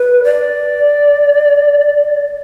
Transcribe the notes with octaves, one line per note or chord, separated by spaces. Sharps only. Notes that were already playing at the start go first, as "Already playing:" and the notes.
Already playing: B4
D5